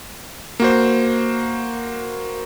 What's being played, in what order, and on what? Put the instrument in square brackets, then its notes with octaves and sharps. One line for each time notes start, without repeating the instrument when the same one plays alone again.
[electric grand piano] A#3 F#4 C5